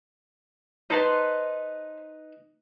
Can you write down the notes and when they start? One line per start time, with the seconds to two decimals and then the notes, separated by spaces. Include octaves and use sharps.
0.90 D#4 B4 C5 A5 C6